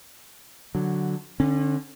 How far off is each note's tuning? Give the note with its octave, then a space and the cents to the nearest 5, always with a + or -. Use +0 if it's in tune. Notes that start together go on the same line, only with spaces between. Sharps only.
D3 +0 F#3 +0
D3 +10 C#4 -35